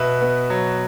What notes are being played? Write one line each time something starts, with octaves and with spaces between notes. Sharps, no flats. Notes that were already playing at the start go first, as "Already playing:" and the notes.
Already playing: B2 B4 E5
B3
F#3